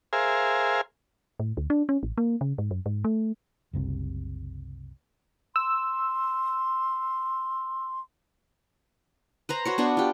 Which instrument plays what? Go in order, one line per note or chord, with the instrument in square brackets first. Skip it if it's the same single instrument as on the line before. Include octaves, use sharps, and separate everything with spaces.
[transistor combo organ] G#4 A#4 C5 E5 F5 G#5
[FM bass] A2
D2
D4
C#4
A1
A#3
C#3
G#2
F#2
G#2
A3
[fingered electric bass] F#1 C2 C3
[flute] C6 [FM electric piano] E6
[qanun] B4 C5 A#5
F#4 C5 C#5
B3 D4 F#4
F4 G4